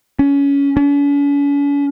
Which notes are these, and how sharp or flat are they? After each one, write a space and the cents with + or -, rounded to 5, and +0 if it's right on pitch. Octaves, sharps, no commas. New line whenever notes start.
C#4 +20
C#4 +45